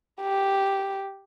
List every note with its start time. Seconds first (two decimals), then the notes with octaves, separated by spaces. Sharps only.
0.22 G4